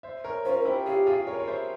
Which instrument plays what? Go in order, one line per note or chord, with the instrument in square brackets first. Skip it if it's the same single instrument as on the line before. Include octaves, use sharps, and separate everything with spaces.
[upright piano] C5 E5
A#4 C#5
[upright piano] C#4 F4 [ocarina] C5
[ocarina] A#4
C5
[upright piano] E4 G4
[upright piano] F4 G#4 [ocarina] G4
[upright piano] F4 G#4
A#4 C#5
C#5
C5 E5